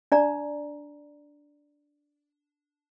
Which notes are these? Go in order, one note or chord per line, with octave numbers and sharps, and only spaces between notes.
D4 D5 A#5